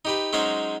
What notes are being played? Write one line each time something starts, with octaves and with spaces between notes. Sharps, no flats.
D#4 G4 B4
F#3 G#3 C#4 D#4 C5